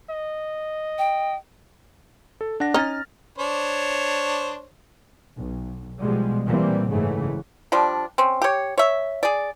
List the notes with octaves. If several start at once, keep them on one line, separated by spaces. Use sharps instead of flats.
D#5
G5
A4
D4 F#5 A#6
C#4 D#4 F6 A6
D4 C5 C#5
B1
B2 F3 G3 G#3
A#2 E3 G3 A#3 C4
F#1 G#2 C#3 E3 A3
F3 G3 D4
C4 C#4
G4 C#5
C#5 E5
G#4 D5